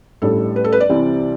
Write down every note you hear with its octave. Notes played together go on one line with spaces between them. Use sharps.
A1 A2 G3 D4 A4
B4
A4
B4
D5
C2 C3 E3 G3 C4